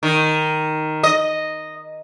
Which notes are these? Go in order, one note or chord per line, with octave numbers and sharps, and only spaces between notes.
D#3
D#5